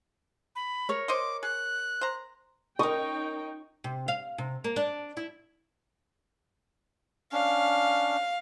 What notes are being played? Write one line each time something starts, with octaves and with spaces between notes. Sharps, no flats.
B5
A#4 C#5
C5 D#5 C6 D6
G#4 F#6
C5 A#5
C#4 D#4 A#4 D#5 G5 C#6
C3
F5
C3
A#3
D4
E4
C#4 D4 F5